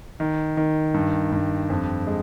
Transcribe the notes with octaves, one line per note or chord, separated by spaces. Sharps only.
D#3
D#3
G2
G2
F2
G#3